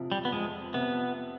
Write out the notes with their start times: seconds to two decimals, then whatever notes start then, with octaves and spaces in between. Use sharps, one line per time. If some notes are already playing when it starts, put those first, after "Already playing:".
Already playing: F2 C3 F3
0.12 G3
0.25 B3
0.32 F2 G#3
0.74 C3 F3 B3